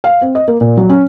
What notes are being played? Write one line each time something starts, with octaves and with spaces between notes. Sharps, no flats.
F5
C4
D#5
A#3
A#2
F#3
C#4